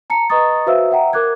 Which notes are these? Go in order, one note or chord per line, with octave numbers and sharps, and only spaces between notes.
A5 A#5 C#7
B4 D#5 A#5 C#6 D#6 A6
F#4 B4 C5 E5 F5 E6
E5 F#5 G5 A#5
A#4 D6 F#6 G#6